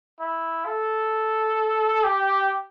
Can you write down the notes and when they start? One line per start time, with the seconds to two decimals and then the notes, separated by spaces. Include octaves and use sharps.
0.20 E4
0.66 A4
2.04 G4